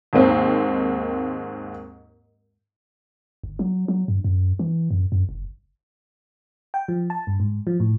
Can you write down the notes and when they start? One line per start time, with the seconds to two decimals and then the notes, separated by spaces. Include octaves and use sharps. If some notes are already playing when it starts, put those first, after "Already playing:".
0.13 D#2 G#2 A#3 C4
3.44 G1
3.59 F#3
3.88 F#3
4.08 G2
4.24 F#2
4.59 E3
4.91 F#2
5.12 F#2
5.29 F#1
6.74 G5
6.88 F3
7.10 A5
7.27 G2
7.40 G#2
7.67 F3
7.80 A2